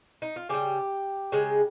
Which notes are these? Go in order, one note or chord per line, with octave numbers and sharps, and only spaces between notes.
D#4
F4
C#3 G3 G4
C#3 G#3